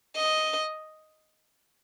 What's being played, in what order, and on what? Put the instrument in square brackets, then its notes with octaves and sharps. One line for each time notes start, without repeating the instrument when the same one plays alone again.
[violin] D#5